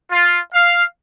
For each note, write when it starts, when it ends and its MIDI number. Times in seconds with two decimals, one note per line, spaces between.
0.10 0.37 65
0.53 0.84 77